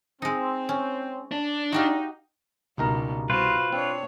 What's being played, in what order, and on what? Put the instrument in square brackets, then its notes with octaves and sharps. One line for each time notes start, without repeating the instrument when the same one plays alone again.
[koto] G#3 D#4 [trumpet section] C4
[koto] C#4
[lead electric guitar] D4
[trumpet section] D#4 [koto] F#4 G4 F5
[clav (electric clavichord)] C#2 D#4 A#4 [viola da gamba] G2 B2 G3
[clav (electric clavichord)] C2 [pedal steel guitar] F4 B4 [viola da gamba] F#4 C5
[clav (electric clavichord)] C4 [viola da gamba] D4 C#5